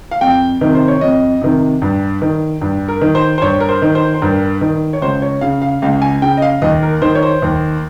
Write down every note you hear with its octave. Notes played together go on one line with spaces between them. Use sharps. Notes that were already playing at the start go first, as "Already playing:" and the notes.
F5
F2 G5
C3 D#3
C5
C#5
F2 D#5
C3 D#3
G2
D#3
G2
A#4
D#3
C5
C5
G2 C#5
A#4
C5
D#3
C5
C5
G2 A#4
D#3
C#5
C#2 C5
C#5
C#3 F5
F5
C#2 F5
G#5
C#3 G5
D#5
F5
D#2 D#5
A#4
D#3 C5
C#5
C5
D#2